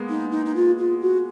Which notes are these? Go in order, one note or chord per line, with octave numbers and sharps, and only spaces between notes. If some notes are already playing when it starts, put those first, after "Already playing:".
Already playing: G#3 A#3 B3
D#4
D#4
D#4
F4
F4
F#4